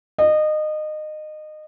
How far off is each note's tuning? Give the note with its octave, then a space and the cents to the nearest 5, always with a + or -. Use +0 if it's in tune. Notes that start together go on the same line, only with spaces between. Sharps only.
D#5 -25